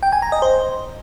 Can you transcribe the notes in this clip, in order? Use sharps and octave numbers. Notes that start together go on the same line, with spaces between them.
G5
G#5
A#5
D#5
C5